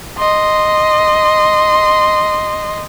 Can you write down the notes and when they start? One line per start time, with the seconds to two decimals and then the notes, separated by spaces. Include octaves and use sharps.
0.18 D#5 C6